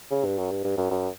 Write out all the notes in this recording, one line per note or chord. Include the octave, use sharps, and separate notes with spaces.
C#3
G2
F#2
G2
G2
F#2
F#2